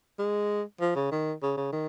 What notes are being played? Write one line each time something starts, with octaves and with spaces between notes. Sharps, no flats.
G#3
F3
C#3
D#3
C#3
C#3
D#3